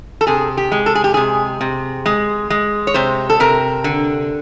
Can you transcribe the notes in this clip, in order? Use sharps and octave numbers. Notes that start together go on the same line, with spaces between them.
A4
C3 G#4
G4
G#3
A4
G#4
G4
C3 G#4
C3
G#3
G#3
C#5
C3 C5
A4
C3 A#4
D3